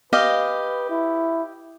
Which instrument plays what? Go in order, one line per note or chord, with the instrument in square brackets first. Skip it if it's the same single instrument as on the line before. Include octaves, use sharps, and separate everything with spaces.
[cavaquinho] G4 D#5 F5 [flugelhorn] B4
[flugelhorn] E4